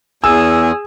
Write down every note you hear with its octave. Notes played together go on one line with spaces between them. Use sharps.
E2 G#4 G#5 E6